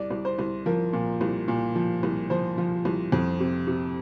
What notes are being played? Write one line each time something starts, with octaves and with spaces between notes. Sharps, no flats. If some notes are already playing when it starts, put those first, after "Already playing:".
Already playing: C2 D5
C2
C5
C2
F3 A#4
A#2
C2
A#2
F3
C2
F3 C5
F3
C2
F2
C3
C3